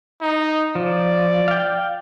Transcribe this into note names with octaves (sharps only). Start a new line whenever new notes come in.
D#4
F3 D5
F5 G5